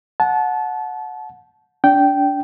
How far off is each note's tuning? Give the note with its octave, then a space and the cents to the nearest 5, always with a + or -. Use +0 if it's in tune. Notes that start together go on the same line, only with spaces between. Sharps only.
F#5 -15 A5 -25
D4 -25 G5 -10